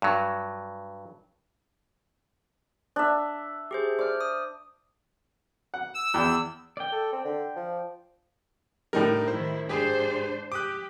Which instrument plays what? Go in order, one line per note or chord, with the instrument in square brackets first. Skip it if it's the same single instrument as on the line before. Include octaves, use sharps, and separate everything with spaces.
[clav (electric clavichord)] G2 F#3
[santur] D4 E5
[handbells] G4 G#4 C5
[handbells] C5 F6 [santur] D5
[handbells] D#6
[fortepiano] F#5
[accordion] E6
[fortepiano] E2 D5 G5
[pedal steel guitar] D5 G5
[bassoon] A4
C4
D3
F3
[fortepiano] A2 D3 G3 [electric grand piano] D4 D#4 A#4
[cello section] D#3 E4 [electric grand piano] C5
[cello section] G#2 D4 C5 [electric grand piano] G4 G#4
[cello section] G4 [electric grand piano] D6 D#6 F#6